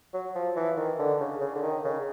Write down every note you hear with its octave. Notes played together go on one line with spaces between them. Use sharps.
F#3
F3
E3
D#3
D3
C#3
C#3
D3
D#3
C#3